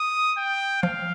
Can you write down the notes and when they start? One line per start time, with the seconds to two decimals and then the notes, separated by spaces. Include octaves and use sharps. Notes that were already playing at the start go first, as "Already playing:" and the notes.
Already playing: D#6
0.37 G5
0.82 F3 F5